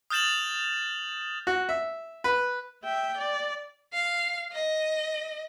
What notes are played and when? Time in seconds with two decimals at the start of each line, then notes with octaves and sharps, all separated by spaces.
0.10 D#6 F6 G6 A6 E7 F#7
1.47 F#4
1.69 E5
2.24 B4
2.84 E5 G5
3.18 D5
3.93 F5
4.52 D#5